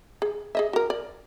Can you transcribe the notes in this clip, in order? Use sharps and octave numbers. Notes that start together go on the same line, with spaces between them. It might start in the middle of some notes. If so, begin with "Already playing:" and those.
G#4
G#4 D#5 E5
F#4 A#4
D5